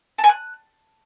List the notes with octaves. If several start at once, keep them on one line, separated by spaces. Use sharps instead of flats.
A5
G#5
F#6